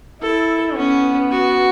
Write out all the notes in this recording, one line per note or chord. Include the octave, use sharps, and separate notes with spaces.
E4 A4
B3 C#4
F#4